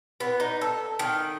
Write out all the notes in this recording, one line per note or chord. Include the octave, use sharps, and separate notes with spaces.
B3
D#4
A4
D#3